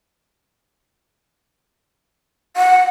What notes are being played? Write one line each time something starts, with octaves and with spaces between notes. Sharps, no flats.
F#5